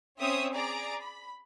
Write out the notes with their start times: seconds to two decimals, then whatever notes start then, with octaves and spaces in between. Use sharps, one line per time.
0.20 C4 C#4 C#5 E5 D#6 E6
0.53 G#4 D5 A#5 D7
1.01 B5